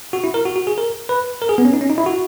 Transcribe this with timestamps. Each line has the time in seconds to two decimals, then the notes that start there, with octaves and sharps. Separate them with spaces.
0.13 F#4
0.24 E4
0.34 A#4
0.46 F#4
0.56 F#4
0.67 G#4
0.78 A#4
1.09 B4
1.42 A#4
1.49 G#4
1.58 B3
1.65 C#4
1.74 D#4
1.81 C#4
1.90 D#4
1.98 E4
2.06 F#4